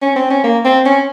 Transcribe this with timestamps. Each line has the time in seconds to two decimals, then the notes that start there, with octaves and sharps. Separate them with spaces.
0.02 C#4
0.16 C4
0.30 C#4
0.44 A#3
0.64 C4
0.86 C#4